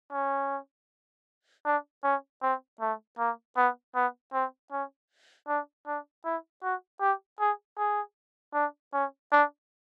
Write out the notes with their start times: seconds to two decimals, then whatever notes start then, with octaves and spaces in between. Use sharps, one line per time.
0.12 C#4
1.65 D4
2.04 C#4
2.42 C4
2.81 A3
3.19 A#3
3.57 B3
3.95 B3
4.33 C4
4.72 C#4
5.48 D4
5.86 D4
6.25 E4
6.63 F#4
7.01 G4
7.40 G#4
7.78 G#4
8.54 D4
8.93 C#4
9.32 D4